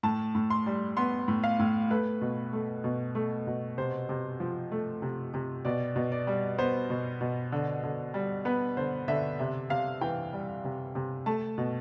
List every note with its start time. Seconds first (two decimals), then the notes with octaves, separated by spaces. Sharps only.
0.03 A2 A5
0.35 A2
0.50 C6
0.66 G3
0.97 B3 C6
1.28 A2
1.44 F5
1.59 A2
1.90 A3 B4
2.21 B2
2.53 A3
2.84 B2
3.15 A3
3.47 B2
3.77 C3 C5
4.09 C3
4.40 F3
4.72 A3
5.02 C3
5.34 C3
5.65 B2 D5
5.96 B2
6.12 D5
6.27 G3
6.58 B3 C5
6.90 B2
7.21 B2
7.52 D3
7.83 D3
8.14 G3
8.45 B3 B4
8.77 D3 C5
9.08 D3 E5
9.39 C3 E5
9.70 C3 F5
10.01 E3 G5
10.33 G3
10.64 C3
10.95 C3
11.26 A3 A5
11.58 B2